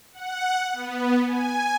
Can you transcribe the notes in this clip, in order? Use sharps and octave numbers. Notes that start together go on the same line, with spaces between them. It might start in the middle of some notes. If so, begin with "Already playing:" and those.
F#5
B3
G#5